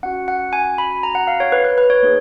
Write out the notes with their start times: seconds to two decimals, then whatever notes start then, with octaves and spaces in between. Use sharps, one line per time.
0.03 C#4 F#4 F#5
0.28 F#5
0.53 G#5
0.78 B5
1.03 A#5
1.15 F#5
1.27 F5
1.40 C#5
1.52 B4
1.65 B4
1.78 B4
1.90 C#5
2.03 A#3 D#4 G#4